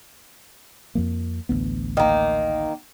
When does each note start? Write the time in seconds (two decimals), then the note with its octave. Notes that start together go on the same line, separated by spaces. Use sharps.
0.95 F2 F3 A#3
1.49 A1 D2 B3
1.97 D#3 A#3